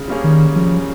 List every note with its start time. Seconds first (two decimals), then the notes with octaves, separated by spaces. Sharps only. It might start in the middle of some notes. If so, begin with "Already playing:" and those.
Already playing: C#3
0.08 G3 A#3 C#4 G#4
0.24 D#3
0.56 C#3 F3